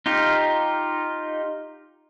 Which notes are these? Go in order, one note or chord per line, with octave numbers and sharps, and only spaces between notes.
D#4 F4 G4